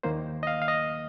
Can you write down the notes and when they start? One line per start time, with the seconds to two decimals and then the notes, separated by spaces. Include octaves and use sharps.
0.03 D#2 D#3 A#3 C5
0.43 D#5
0.47 F5
0.62 F5
0.68 D#5